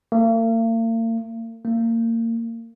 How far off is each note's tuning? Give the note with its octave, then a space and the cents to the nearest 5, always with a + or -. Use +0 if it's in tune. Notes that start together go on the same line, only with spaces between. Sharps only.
A#3 -45
A#3 -30